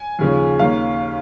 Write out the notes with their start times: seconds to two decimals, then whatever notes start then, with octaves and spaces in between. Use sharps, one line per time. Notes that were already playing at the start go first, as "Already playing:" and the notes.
Already playing: G#5
0.19 D#2 C#3 F3 C#4
0.59 D#2 D#3 A#3 C#4 F5